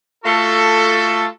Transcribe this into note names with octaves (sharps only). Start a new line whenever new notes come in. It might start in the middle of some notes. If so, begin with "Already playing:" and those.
A3 F4 F#4 A4